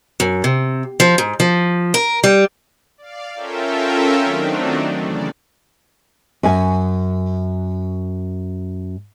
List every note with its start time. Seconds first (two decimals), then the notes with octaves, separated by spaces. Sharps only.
0.20 F#2
0.44 C3
1.00 F3
1.18 G#2
1.40 F3
1.94 A#4
2.24 G3
2.98 D5 F5
3.35 C#4 F4 A4 A#4 E5 G5
4.23 D#3 F#3 A3 C4 D4 D#4
4.95 E2 C#3 D5
6.43 F#2 G#5